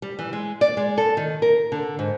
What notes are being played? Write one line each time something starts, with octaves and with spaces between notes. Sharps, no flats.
G3
E3
G#3
D5
G#3
A4
D#3
A#4
D3
G#2